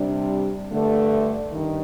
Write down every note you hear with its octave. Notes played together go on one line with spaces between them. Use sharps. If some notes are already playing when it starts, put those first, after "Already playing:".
Already playing: C3 G3 D4
G2 D3 A3
G2 D#3